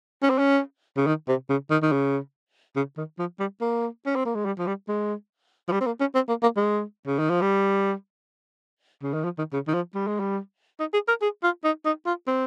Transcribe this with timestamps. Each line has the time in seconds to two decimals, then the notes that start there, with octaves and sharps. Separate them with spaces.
0.23 C#4
0.30 C4
0.39 C#4
0.97 C#3
1.07 D#3
1.28 C3
1.49 C#3
1.71 D#3
1.83 D#3
1.92 C#3
2.76 C#3
2.97 D#3
3.19 F3
3.40 G3
3.61 A#3
4.06 C#4
4.16 C4
4.25 A#3
4.35 G#3
4.45 G3
4.58 F3
4.67 G3
4.88 G#3
5.68 F3
5.72 G3
5.81 C4
5.86 A#3
6.00 C#4
6.15 C4
6.29 A#3
6.43 A#3
6.57 G#3
7.07 C#3
7.19 D#3
7.30 F3
7.42 G3
9.03 C#3
9.14 D#3
9.24 F3
9.38 D#3
9.53 C#3
9.68 D#3
9.74 F3
9.95 G3
10.07 G#3
10.20 G3
10.80 D#4
10.94 G#4
11.08 A#4
11.22 G#4
11.43 F4
11.64 D#4
11.85 D#4
12.06 F4
12.27 C4